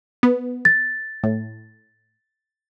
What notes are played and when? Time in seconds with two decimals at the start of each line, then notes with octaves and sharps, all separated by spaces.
0.23 B3
0.65 A6
1.23 A2